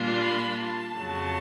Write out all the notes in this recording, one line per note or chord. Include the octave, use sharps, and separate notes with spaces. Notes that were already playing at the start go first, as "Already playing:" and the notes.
Already playing: A#2 G3 A#3 D4 F4
B5
A5
F2 C#3 F#3